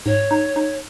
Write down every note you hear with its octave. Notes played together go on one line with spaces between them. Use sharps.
G#2 C#5
D#4
D#4